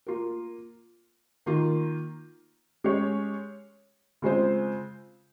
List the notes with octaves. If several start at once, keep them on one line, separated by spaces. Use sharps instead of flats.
A#3 F4 A#4
D#3 A#3 F4
G#3 C#4 G4 C#5
C#3 G#3 C4 F4 C5